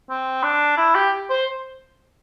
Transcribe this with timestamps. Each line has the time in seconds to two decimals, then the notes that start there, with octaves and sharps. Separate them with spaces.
0.10 C4
0.43 D4
0.77 E4
0.95 G4
1.30 C5